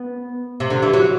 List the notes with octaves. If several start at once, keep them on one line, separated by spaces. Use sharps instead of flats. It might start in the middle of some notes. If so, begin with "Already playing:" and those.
Already playing: B3
C3
D3
E3
F#3